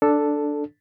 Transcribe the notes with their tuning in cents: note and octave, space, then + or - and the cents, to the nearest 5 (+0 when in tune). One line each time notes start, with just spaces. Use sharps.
D4 +0 A4 +0